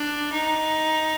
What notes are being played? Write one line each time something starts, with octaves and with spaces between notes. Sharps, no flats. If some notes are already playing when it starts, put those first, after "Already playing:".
Already playing: D4
D#4